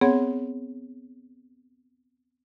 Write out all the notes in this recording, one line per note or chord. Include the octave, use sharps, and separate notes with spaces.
B3 C4 G#4 C#5 F#5